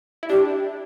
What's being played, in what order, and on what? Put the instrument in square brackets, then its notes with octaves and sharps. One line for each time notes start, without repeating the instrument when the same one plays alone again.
[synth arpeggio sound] E4
[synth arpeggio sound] D4 [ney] G4